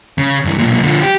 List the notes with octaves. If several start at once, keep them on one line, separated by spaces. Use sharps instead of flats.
C#3
G2 E3
B1 A#2
D3 F3
G4